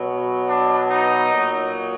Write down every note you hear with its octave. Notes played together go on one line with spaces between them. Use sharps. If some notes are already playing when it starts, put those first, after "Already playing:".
Already playing: B2 F#3
D4
D#4
A#2 F#3